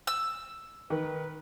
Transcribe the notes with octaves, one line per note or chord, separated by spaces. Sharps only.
E6
D#3 B4